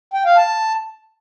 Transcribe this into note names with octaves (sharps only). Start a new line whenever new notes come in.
G5
F5
A5